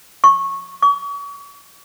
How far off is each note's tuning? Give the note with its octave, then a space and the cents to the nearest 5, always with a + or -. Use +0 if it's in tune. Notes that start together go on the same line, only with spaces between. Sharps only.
C#6 -15
C#6 +40